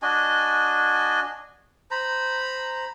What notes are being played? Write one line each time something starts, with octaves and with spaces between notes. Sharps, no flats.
D4 F#4 D#5 G#5
C5 A#5 B5